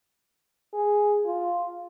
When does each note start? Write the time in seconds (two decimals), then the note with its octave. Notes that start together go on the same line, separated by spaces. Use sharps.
0.74 G#4
1.26 F4